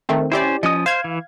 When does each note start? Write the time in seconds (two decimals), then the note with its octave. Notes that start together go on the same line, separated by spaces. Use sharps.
0.09 D#3 A3 C4
0.32 C#4 E4 G4 C5 D5
0.63 F3 C#4 D#5 D#6
0.86 C5 F5 G#6
1.04 E3